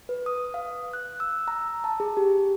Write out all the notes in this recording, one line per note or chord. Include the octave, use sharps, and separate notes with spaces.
B4
D#6
F5
F#6
E6
A#5
A5
G#4
G4